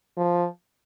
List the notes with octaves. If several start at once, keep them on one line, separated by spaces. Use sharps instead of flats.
F3